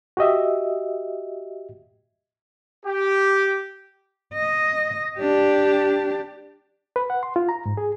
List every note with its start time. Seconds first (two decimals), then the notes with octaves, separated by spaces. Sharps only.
0.17 F#4 G4 D#5 E5
2.85 G4
4.34 D#5
5.19 D4 G4
6.96 B4
7.10 F#5
7.23 C6
7.36 F4
7.49 A#5
7.66 G#2
7.77 G#4